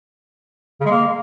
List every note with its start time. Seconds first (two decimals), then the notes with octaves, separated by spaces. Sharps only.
0.80 C#3
0.85 G#3
0.91 A#3